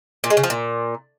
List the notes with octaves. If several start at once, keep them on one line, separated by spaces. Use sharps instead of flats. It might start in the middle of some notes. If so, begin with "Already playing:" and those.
A#2
G#3
C#3
F3
A#2